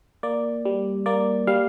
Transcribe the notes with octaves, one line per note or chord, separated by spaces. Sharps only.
A#3 D5
G3
A#3 D5
G3 F5